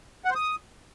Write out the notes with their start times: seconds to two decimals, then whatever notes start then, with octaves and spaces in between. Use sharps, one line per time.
0.25 F#5
0.30 C5
0.35 D#6